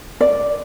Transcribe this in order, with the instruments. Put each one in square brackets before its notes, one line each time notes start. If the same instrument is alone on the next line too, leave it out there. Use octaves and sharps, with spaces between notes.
[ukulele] D5